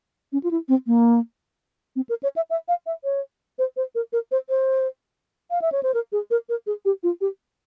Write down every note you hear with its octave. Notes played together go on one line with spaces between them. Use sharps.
C#4
F4
E4
C4
A#3
C4
A#4
C#5
E5
E5
F5
E5
C#5
C5
C5
A#4
A#4
C5
C5
F5
E5
C#5
C5
A#4
G#4
A#4
A#4
G#4
G4
F4
G4